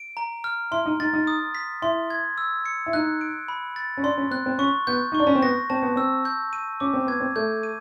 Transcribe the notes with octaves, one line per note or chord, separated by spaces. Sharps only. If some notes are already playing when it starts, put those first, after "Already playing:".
Already playing: D7
A#5
F6
E4 C6
D#4
D#4 A6
D#4
D#6
B6
E4 C6
G#6
E6
C#7
E4
D#4 F#6
D7
B5
A6
C#4
D4 C6
C#4
C4 F#6
C4
C#4 C#6
B3 G6
D#4
C#6
D4
C#4
C4
B3 A#6
C4 A5
B3
C4 E6
G6
D#7
C#4 D6
C4
B3 G#6
C4
A3 G6
D#7